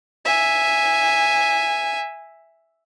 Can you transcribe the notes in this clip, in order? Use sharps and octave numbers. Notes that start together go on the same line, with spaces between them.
E5 G#5